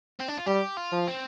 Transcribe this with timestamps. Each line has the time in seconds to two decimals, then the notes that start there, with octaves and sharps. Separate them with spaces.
0.20 C4
0.28 D4
0.38 F4
0.46 G3 G4
0.77 F4
0.92 F3
1.07 C4